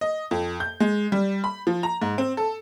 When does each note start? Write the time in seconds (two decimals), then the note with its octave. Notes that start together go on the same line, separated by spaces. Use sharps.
0.01 D#5
0.31 F2
0.60 G6
0.80 G#3
1.12 G3
1.44 B5
1.67 F3
1.83 A#5
2.02 G#2
2.18 C4
2.37 A4